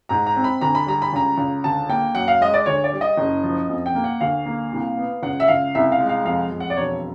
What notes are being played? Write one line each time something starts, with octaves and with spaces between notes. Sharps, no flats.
G#2 A#5
A#5
C4
B5
D2 A#5
B5
G3 A#5
B5
C#2 A#5
C#2
D2 A5
A#3 G5
F#2 F#5
F5
G#3 D#5
D5
D2 C#5
D5
G3
D#5
F#1
F3
F2
G5
A#3
F#5
D2 F5
A#3
C2
B3
C#2 F#5
E5
C#2 F5
C2 E5
F5
G#3
F5
F2 F5
F2
F#5
D5
E1 C#5